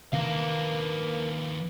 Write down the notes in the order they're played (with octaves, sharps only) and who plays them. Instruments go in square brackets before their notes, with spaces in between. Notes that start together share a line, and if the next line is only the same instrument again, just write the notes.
[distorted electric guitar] D#2 D4 [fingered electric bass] C3 D#3 E3 [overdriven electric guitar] A#4 F5 [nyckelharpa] B4